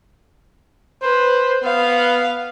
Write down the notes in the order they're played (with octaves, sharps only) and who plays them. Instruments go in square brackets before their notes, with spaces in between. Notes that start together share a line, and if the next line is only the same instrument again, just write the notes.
[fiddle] B4 [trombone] C5
[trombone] B3 [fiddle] F5